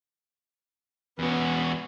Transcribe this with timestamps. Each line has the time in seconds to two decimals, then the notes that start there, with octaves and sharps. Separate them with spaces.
1.19 E2 B3 C#4 F#4